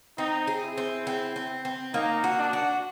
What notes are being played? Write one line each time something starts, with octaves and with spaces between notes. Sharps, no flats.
C4 D#4
G#4
E4
C4
C4
C4
C4
A#3 D#4
F#4
D4
F#4